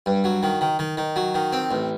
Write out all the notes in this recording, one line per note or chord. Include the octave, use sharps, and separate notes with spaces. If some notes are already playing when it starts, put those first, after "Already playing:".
G2
F#3
D#3
D#3
D#3
D#3
F#3
D#3
C4
A1